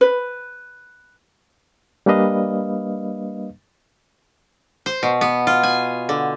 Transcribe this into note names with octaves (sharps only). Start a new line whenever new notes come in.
B4
G3 A#3 D4 B4 D#5 F5
C5
B2
B3
F4
G#5
D3